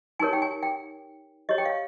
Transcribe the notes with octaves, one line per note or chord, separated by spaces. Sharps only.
D#4 G4 A#4 C#5 G#5
G5
G#5
G5
G4 C#5 D#5
G5
F5